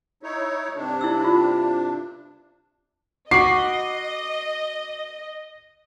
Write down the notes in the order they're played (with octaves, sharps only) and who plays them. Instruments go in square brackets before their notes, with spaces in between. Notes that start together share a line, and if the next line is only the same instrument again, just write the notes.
[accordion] D#4 E4 C#5
G2 C3 D4
[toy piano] E4 E6
E4 F4
[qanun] F#4 B5 [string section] D#5 [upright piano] D6 [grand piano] C7